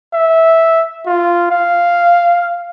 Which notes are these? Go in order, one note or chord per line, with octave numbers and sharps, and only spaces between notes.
E5
F4
F5